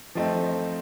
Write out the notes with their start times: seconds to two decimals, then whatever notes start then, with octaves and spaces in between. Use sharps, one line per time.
0.15 F3 A3 C4 D#4